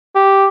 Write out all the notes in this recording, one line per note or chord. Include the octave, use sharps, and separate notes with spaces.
G4